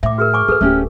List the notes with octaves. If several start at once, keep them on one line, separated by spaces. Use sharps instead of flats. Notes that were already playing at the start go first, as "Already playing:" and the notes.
A2 E5 D6
F#4 G#4 A#4 F6
G#5 C#6 D6
D3 G#4 A4 B4
D1 A3 C#4 G4